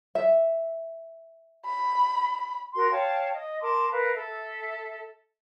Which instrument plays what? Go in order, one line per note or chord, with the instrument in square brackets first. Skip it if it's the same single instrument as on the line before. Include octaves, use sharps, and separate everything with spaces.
[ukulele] E5
[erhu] B5
[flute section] F#4 A#4 C6
C#5 F5 G5 A5
D#5
A#4 A5 C6 D6
A#4 B4 F5
A4 E5